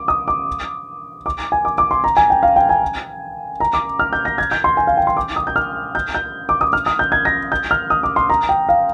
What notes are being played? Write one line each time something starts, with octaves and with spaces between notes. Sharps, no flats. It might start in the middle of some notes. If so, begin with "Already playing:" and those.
Already playing: D6
D#6
D6
D6
G#5
D6
D6
C6
A#5
G#5
G5
F5
G5
G#5
A#5
D6
F6
G6
A#6
G#6
G6
C6
G#5
F5
G5
C6
D6
D#6
G6
F6
G6
G6
D6
D#6
F6
D#6
G6
G#6
A#6
G6
F6
D#6
D6
C6
A#5
G5
F5